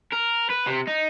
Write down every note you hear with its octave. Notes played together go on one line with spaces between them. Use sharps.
A#4
B4
C3
D#4